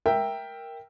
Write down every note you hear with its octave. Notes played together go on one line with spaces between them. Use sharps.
A#4 E5 G5